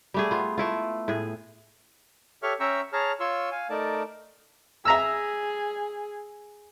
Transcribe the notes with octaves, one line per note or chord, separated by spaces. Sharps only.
G3 A3 G#4
B3 F4
A3 E4 F4
A2 G#4
G4 A4 C#5 E5 C#6 F6
C#4 E5 G5 A#5 C#6 E6
G#4 C#5 A5 A#5 F6
F4 C#5 C6 C#6 E6
F5 G#5
A3 D#4 A#4 D5 A5
G#4 E5 A#5 E6